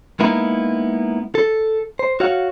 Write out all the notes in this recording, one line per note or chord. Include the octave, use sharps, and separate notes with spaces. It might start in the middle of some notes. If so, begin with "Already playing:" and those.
G#3 A#3 B3 D#4 E4
A4
C5
F#4 C#5 F5 F#5